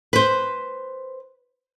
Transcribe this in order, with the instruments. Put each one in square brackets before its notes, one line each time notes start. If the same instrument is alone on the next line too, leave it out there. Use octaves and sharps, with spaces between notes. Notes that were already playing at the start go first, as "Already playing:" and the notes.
[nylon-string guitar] B4 C5